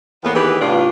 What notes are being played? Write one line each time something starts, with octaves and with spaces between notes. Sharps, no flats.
E2 A2 A#3 B3
D#3 E3 G4 G#4 B4
A2 C#3 D4 F4